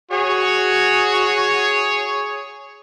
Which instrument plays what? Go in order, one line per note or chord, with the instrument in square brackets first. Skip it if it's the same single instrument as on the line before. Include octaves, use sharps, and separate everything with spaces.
[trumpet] F#4 [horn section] G#4 C#5